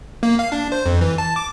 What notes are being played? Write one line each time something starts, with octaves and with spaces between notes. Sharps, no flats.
A#3
F5
D4
C5
F2
E3
A5
D6